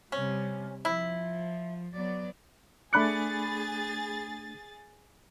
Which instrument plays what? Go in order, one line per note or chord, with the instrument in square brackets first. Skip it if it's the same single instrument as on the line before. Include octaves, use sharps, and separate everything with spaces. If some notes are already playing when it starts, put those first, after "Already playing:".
[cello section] C3 G3 [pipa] C#4
[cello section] F3 [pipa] E4
[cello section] F#3 B3 D5
[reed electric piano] A3 D4 D6 [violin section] G#4 A6 [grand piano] B5 F#6 C#7